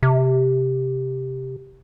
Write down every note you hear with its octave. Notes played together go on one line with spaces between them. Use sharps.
C3